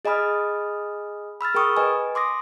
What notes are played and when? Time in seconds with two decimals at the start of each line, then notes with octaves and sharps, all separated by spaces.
0.05 G#4 D#5 G#5 B5 D#6 F6
1.41 B5 E6 F6 A6
1.54 G#4 A#4 G5 B5 C#6 D#6
1.77 B4 D#5 G#5
2.15 C6 D6 D#6 A#6